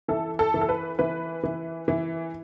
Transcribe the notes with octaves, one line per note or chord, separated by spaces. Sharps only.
E3 A4
A4
E3
A4
B4
E3 B4
E3
E3